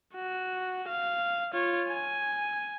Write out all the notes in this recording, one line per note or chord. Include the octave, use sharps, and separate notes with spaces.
F#4
F5
F4 C#5
G#5